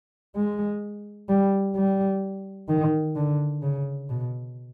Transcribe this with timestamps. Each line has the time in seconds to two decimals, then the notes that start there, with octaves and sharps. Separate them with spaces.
0.36 G#3
1.29 G3
1.76 G3
2.69 D#3
3.16 D3
3.62 C#3
4.10 B2